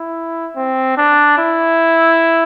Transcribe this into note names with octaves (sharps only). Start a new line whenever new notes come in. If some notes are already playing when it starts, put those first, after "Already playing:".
Already playing: E4
C4
D4
E4